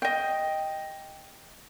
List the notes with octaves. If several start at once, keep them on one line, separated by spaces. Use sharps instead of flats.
D#5 G5